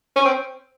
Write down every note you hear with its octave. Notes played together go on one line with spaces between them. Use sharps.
C#4
C4